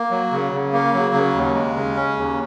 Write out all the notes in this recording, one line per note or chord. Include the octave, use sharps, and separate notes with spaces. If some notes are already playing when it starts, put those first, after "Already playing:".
Already playing: A#3
F#3
C#3
C#3
A#3
F#3
C#3
D#2
G#3
C#3
C#4
D#2